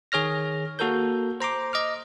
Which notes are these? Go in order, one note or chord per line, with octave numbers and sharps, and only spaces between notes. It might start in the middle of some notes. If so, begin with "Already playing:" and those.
D#3 G#4 C#5 F6 A#6
A#3 F#4 A4 A#4 G6
C5 A#5 C6 D6
D#5 D6 F6